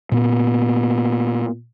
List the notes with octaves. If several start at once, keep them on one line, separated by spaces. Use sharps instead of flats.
A#2 B3